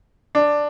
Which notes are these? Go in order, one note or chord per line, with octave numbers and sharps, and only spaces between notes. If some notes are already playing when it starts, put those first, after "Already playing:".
D4